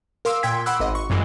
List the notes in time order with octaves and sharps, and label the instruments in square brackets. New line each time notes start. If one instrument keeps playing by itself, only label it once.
[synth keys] A#4 F5 C6 D6 E6
A#2 G5 C6 G#6 B6
F#5 B5 C6 D6 E6 F#6
G#1 D#5
C#6
F#2 A#2 E3 G#3